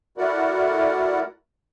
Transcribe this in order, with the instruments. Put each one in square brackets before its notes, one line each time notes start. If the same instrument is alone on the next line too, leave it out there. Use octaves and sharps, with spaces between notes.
[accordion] A3 E4 F#4 A#4 D5 F#5